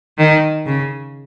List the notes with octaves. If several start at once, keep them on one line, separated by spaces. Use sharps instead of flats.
D#3
C#3